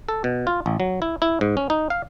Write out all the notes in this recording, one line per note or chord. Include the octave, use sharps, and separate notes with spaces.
A4
B2
F4
A1
F#3
E4
E4
G#2
C#4
D#4
F5